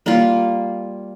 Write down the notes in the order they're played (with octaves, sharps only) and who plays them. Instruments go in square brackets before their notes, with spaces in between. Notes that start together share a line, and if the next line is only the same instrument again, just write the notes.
[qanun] G3 A#3 F4